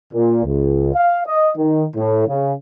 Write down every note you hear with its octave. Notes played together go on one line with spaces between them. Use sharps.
A#2
C#2
F5
D#5
D#3
A2
C#3